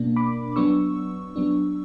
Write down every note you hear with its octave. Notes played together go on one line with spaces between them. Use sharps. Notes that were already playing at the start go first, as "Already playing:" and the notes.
Already playing: B2 A#3 D4
B5 D6
F#3 B3 D4 C#6 E6
F#3 B3 D4